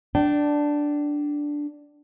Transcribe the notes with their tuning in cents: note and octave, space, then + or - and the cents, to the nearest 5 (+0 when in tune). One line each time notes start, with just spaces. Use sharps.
D4 +0 G5 -30